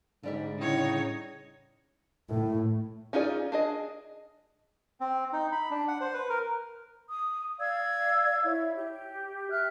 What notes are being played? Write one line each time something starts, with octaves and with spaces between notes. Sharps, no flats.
G#2 D3 G3 E5
A2 C#3 D#4 C#5
A2
C#4 D#4 F4 G#4 D5
D4 G#4 D#5
C4
D#4
B5
D4
F#5
C5
B4
A#4
D#6
D5 F5 E6 G#6
E4 C#5
G4
E5 F6 F#6